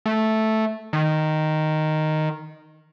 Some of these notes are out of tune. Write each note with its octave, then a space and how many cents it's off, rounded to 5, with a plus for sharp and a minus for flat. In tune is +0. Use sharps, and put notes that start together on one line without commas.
A3 -5
D#3 -5